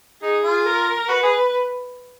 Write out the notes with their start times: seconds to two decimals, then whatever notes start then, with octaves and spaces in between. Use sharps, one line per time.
0.22 D#4 G#4
0.43 F4
0.66 A#4
1.08 F#4 B4
1.23 G#4